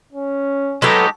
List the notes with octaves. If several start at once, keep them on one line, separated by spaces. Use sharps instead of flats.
C#4
F#3 G#3 B3 D#4 G4 A4